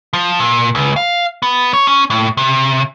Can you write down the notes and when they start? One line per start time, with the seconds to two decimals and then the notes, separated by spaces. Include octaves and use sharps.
0.13 F3
0.40 A#2
0.75 C#2
0.96 F5
1.43 B3
1.73 C#5
1.88 C#4
2.10 A2
2.37 C3